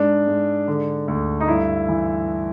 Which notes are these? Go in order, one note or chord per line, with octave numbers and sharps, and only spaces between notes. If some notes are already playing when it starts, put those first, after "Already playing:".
Already playing: G#2 D4
G#2
D3
D2
D#4
G2 E4
E3